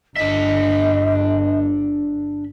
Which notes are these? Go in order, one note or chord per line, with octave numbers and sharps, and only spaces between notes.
G1 D4 D#5 E5